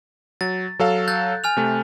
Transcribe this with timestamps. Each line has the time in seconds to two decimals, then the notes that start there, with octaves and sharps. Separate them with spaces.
0.41 F#3 A6
0.79 F#3 A4 F5
1.08 F#6 G6 A6
1.44 G#5 F6 F7
1.57 C3 A3